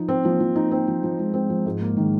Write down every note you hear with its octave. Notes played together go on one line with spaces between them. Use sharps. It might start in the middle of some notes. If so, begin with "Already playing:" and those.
Already playing: F3 D#4
C4
F3 A#3
F3
D#4
C4
F3
F3
G#3 D#4
C4
F3
G#2
A#3
D#3